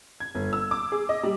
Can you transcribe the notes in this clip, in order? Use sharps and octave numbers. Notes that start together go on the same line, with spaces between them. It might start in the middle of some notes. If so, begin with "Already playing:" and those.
G#6
G1
E6
D6
G#4
D#5
G3